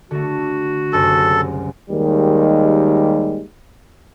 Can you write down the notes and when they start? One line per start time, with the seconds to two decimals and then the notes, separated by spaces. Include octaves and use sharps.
0.11 D3 A3 F#4
0.93 F#1 C2 F#2 A4
1.90 D#2 D#3 G3 G#3